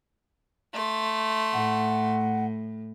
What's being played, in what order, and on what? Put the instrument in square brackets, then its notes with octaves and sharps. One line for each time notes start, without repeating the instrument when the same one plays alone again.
[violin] A3 C6
[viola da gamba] A2 [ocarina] F#5